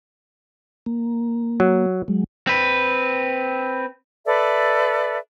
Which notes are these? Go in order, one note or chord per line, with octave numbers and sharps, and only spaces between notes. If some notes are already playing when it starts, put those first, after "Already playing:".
A#3
F#3
F#3 G#3
C4 B4
A4 B4 D5 E5